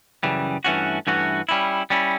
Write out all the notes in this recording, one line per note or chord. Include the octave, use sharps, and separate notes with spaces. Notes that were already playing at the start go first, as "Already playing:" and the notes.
F#2 C#3 E3 G3
G2 E3 A3 C#4 F#4
G2 E3 A3 C#4 F#4
G3 C#4 E4
G3 C#4 E4